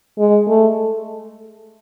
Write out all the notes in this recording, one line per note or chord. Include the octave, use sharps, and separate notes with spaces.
G#3
A3